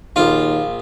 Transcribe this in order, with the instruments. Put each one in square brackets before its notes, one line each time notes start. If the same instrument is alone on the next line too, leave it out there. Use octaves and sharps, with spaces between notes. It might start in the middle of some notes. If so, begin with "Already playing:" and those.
[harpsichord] A#1 F4 [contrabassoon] D#2